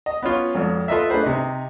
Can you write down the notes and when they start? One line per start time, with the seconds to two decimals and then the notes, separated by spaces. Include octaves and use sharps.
0.06 D#5
0.22 B3 C#4 F4
0.55 G#1 F2
0.88 F4 A4 B4 D#5 E5
1.10 A3 D4 G#4 B4 C5
1.23 C3 D#4